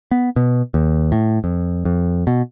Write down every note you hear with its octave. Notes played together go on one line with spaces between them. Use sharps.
B3
B2
D#2
A2
F2
F2
B2